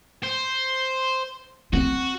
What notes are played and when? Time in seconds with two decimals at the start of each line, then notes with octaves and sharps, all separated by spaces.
0.24 C5
1.73 C4 F#4